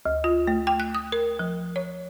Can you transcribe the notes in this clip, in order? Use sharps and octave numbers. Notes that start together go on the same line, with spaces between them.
D2
F4
A3
G5
F#6
D#6
A#4
F3
C#5